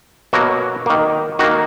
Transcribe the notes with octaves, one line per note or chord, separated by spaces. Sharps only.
B2 F#3 A#3 F#4
D#3 A#3
D#3 A#3 F#4